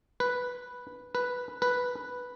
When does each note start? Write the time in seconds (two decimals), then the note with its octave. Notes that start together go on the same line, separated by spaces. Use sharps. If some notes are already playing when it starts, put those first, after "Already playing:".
0.20 B4
1.15 B4
1.62 B4